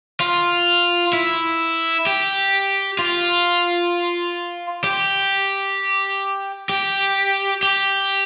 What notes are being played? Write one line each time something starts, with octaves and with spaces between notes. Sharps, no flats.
F4
E4
G4
F4
G4
G4
G4